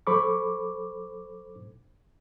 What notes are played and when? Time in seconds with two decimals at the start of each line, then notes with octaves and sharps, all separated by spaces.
0.07 F#3 A4 C5 B5 C#6 D6